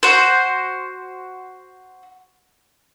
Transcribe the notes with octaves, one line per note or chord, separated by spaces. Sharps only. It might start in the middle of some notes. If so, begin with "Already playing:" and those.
F#4 C5